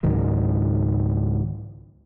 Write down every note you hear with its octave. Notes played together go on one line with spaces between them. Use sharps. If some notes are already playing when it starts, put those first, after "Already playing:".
C#2 G#2 D#3 F#3